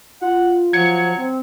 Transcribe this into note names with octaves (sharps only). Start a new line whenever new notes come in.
F4 F#5
F3 F#3 G#6 C#7
C4